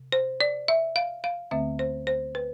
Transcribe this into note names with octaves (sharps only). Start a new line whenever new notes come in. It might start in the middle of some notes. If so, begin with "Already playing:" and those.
Already playing: C3
C5
D5
E5
F5
F5
D2 D3 A3 C4 E5
C5
C5
B4